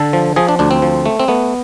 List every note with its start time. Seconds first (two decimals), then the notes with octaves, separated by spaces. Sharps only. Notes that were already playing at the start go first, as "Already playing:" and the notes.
Already playing: D3 A4
0.13 F3
0.36 F3 G#4
0.49 D4
0.59 D2 D4
0.71 C4
0.82 F3
1.06 A3
1.20 C4
1.28 A3 B3